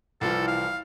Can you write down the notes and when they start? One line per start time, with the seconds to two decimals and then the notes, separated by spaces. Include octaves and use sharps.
0.21 C2 E3 F3 A4
0.47 F5